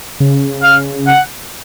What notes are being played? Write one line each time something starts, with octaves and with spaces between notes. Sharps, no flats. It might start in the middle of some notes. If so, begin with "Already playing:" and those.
C#3
F5
F#5